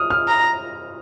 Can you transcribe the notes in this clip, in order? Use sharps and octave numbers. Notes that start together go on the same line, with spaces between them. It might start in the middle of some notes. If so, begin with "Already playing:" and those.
Already playing: D#6 F6
F6
A#5